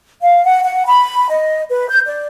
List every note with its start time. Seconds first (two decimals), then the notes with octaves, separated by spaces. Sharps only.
0.21 F5
0.45 F#5
0.64 F#5
0.87 B5
1.30 D#5
1.69 B4
1.89 G6
2.06 D5